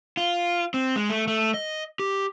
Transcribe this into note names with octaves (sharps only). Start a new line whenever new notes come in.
F4
C4
G#3
A3
A3
D#5
G4